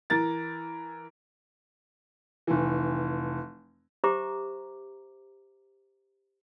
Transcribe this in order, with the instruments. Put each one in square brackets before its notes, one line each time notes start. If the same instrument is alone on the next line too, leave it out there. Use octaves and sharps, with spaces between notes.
[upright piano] E3 A#4 A6
F1 E3
[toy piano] G4 C5 E5 A#5 D6